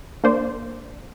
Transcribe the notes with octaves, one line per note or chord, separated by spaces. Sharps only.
A#3 D4 C5 D5